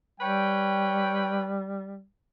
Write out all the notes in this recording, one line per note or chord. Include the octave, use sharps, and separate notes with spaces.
G3 B4 C#5 G5